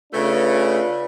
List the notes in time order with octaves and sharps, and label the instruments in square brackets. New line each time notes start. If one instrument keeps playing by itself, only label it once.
[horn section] C#3 A3 [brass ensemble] D4 F4 B4